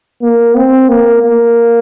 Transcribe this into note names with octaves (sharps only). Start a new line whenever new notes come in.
A#3
C4
A#3
A#3